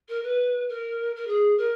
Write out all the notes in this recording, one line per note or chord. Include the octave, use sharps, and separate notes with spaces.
A#4
B4
A#4
A#4
G#4
A#4